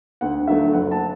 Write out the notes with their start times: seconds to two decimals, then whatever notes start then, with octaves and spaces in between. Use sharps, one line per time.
0.21 D2 F#5
0.47 D3 F#3 A3 E5
0.73 F#1 F#5
0.91 A5